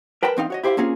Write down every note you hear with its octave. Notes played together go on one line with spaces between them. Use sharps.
A#4 B4 G5 A5 B5
E2 C4 D#4 F5
F#4 C#5 D#5
E4 G4 C5 D5 F5
A#3 C4 C#4 F4 G#4